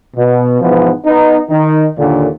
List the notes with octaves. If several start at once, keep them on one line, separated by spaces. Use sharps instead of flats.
B2
G#2 B2 E3 F3 B3
B3 D#4
D#3 D#4
D#2 A#2 D3